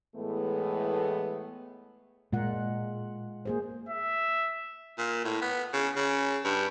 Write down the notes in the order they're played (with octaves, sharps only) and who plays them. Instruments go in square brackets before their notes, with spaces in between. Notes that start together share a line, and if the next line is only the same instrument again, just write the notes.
[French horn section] A2 E3 G#3 A3 B3
[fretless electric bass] A#2 [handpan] G#3 F4 F#5
[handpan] A#3 G#4 C5
[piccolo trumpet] E5
[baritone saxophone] A#2
A2
B3
C#3
C#3
G2